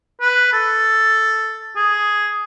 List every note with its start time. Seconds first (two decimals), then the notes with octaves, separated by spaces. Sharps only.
0.21 B4
0.53 A4
1.76 G#4